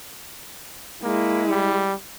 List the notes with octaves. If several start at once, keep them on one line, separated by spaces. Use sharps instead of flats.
G#3 A#3 E4
G3